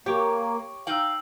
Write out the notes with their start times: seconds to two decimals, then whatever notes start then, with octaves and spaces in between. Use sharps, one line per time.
0.06 A#3 G4 C#5 C#6 D6 D7
0.87 D#4 F5 G5 E6 F#7